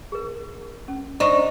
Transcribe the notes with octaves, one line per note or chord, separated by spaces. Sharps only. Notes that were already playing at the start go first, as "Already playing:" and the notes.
G#4 A#4
C#4
D4 D#4 C5 C#6